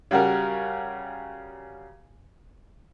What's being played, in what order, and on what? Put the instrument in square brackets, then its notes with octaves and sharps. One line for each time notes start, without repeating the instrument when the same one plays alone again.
[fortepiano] C#3 G3 F#4 A#4